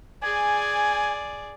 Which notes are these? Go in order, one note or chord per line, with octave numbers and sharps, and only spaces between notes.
G#4 D5 G#5